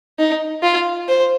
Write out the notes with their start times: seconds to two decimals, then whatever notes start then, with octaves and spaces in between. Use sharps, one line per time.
0.19 D#4
0.62 F4
1.08 C5